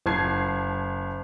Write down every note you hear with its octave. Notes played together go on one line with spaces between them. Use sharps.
F#1 A5 G#6 C7